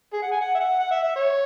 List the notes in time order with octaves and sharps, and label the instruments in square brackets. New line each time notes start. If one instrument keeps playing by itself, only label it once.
[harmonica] G#4
F#5
G#5
F#5
E5
F#5
F#5
E5
E5
C#5